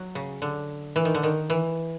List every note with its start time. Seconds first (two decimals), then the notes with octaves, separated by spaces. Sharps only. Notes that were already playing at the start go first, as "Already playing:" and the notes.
Already playing: F#3
0.15 C#3
0.42 D3
0.96 E3
1.05 D#3
1.15 D3
1.23 D#3
1.50 E3